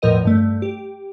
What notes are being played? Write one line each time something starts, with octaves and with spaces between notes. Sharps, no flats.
E2 A2 F3 A#4 D#5 D#7
G2 A3
G4